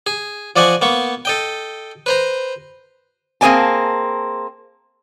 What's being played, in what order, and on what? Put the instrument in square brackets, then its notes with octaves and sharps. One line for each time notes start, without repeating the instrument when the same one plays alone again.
[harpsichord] G#4
F3 D5 D#5 F#5 G#5 C#6
A#3 B3 C#6
A4 D#5 G5
B4 C5 A#5
[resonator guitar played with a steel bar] A#3 C4 G#4 D5 G#5 A5